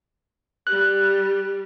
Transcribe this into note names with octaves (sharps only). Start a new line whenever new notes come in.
G3 F#6